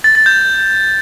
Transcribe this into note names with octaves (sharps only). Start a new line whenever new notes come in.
A6
A6
G6